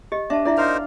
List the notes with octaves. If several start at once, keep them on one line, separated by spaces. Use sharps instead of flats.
G4 D#5
D4 E5 A5
D4 E4 D5 E5
D#4 A#4 C5 F5